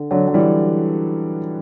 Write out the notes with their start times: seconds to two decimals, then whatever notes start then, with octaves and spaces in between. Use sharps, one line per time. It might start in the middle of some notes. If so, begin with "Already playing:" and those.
Already playing: D3
0.11 D3 F#3
0.28 F#3
0.34 E3 G3